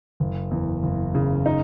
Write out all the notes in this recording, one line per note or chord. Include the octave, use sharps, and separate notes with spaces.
F#1
E2
F#1
C#3
D#4